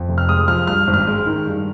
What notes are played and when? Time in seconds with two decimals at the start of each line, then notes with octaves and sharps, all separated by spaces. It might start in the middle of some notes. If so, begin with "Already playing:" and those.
Already playing: F2
0.09 F1
0.18 F6
0.28 G#3 D#6
0.48 F3 F6
0.67 G2 F6
0.87 G#1
0.94 F6
1.07 G#3
1.26 D#3
1.47 G2